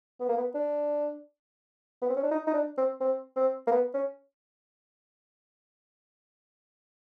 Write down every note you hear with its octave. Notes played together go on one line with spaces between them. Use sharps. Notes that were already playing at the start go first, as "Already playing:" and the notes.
B3
A#3
B3
D4
B3
C4
C#4
D4
D#4
D#4
D4
C4
C4
C4
A#3
B3
C#4